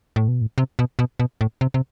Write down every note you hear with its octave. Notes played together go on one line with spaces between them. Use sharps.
A2
B2
A2
C3
B2
B2
B2
A2
C3
C3